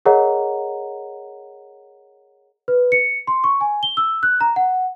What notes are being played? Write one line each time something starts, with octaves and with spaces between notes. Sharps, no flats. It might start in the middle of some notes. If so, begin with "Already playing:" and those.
G#4 A#4 C#5 D#5 F#5 A#5
B4
C#7
C6
C#6
G#5
G7
E6
F#6
A#5
F#5